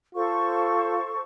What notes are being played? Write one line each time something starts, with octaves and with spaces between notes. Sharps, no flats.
F4 A4 C5 C#6